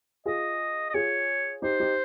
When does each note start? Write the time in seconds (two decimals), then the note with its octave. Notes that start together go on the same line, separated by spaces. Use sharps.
0.26 F4 G#4 D#5
0.90 D#5
0.94 F4 G#4 C#5
1.62 D#4 G4 C5
1.80 D#4 G4